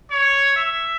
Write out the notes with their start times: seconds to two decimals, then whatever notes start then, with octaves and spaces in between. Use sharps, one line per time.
0.11 C#5
0.56 E5